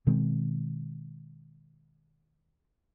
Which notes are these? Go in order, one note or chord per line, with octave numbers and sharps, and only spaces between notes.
B2 D#3 G#3 C4